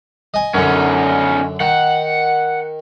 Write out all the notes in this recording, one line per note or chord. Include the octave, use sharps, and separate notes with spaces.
D#5 G#5
F#2 D3 C#4 D#4
D#3 F#5